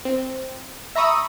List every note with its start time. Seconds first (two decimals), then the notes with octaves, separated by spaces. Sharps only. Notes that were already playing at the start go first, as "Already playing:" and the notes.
0.05 C4
0.95 E5 A#5 B5 C#6 D#6 E6